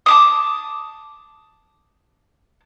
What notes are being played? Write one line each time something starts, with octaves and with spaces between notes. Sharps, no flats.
A5 D6 D#6